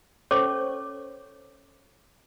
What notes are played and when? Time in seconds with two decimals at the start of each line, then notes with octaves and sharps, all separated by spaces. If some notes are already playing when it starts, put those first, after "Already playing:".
0.31 C#4 A4 C5 C#5 C#6 D6